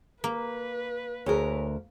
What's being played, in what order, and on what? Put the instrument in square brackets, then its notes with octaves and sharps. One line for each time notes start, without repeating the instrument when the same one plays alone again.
[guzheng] A#3 [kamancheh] B4
[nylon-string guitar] D2 A#4 [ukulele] G#4 C#5